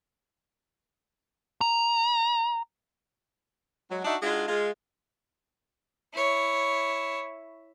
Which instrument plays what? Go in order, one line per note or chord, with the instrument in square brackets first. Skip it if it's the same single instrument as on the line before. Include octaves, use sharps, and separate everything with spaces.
[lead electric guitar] A#5
[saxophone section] F#3 G#3
D4 D#4 F#4 D#5 E5
G#3 D4 D#4 F4 F#4 G#4
G#3 F4
[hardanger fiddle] E4 C#5